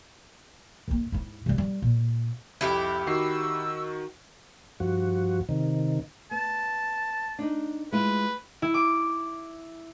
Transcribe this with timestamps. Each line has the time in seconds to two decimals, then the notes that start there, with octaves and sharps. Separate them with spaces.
0.88 G2 A#3
1.12 G#2 E4
1.46 C3 G3
1.58 G3
1.82 A#2
2.61 C2 F2 E4 G4
3.07 D#3 F#4 E6 C7
4.80 G2 F3 F#4
5.49 C3 D#3
6.31 B3 A5
7.39 D4 D#4
7.92 G#3 E4 F4 B4
8.62 E4
8.74 D6